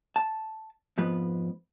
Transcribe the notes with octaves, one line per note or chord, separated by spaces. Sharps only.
A5
F2 G#2 F3 B3 B4